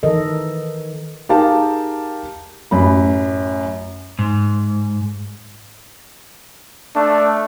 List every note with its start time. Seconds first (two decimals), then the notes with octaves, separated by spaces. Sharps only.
0.03 D#3 E3 A4 A#4 D#5
1.29 D#4 G4 G#4 A#4 F5 A5
2.71 A1 F#2 B5
4.19 G#2
6.96 A3 D4